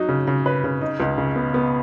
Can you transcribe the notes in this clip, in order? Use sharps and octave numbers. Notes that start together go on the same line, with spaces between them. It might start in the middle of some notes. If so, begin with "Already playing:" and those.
Already playing: F#3 D#4
C#3
C#3
B4
C#3
D#4
C#2
C#3
B3
B3